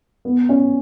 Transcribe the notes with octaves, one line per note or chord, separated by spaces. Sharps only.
B3
C#4